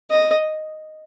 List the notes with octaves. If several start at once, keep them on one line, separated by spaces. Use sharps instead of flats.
D#5